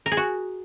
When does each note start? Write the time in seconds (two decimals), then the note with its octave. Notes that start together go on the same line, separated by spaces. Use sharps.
0.06 A#4
0.11 G#4
0.17 F#4